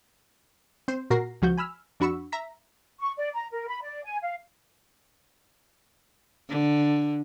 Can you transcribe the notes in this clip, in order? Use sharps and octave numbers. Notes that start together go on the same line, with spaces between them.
C4 C5
A#2 F#4 A#4 A#6 C7
C#2 F3 F#4 G6
G#5 B5 E6 F6
F2 D4 F#4 B5 C#6 E6
E5 A#5 B6
C#6
D5
A#5
A#4
B5
D5
G#5
F5
D3